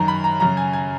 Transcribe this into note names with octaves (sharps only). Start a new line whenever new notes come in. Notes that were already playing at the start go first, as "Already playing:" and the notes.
Already playing: F#2 D#3 A#5
B5
A#5
F#2 C#3 A#5
G#5
G#5